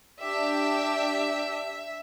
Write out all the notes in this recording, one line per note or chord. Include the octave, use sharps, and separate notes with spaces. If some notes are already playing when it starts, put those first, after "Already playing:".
D4 G4 E5